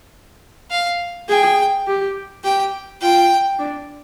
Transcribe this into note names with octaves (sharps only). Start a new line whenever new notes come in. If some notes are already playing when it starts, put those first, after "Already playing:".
F5
G#4 G5
G4
G4 G5
F4 G5
D4